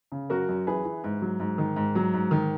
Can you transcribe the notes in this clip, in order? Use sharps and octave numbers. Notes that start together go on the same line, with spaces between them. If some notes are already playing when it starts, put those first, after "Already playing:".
C#3
F#2 F#4 A#4
F#2
E3 G#4 B4
E3
G#2
F#3
G#2
D#3
G#2
F#3
G#2
D#3